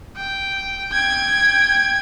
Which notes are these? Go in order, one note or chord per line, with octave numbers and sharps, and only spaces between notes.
G5
G5 G#6